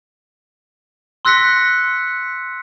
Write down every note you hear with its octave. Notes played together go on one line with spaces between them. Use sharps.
C6 E6 F#6 A#6 B6 C#7